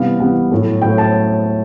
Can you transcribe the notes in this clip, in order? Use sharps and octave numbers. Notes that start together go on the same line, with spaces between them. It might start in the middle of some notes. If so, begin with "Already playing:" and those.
Already playing: C3 E3 G3 B3 F5
C3 E3 G3 B3
A2 F#3 A3
A2 F#3 A3 G5
A5